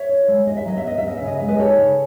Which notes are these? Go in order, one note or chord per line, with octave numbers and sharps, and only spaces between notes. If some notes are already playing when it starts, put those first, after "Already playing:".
Already playing: C#5 E5
E4
G#3
E4 D#5
E5
F#3 D#5
E5
B3 D#5
E5
C#4
D#5
C#3 E5
D#5
G#3 E5
B4 D#5
D#4 A4 C#5
C#3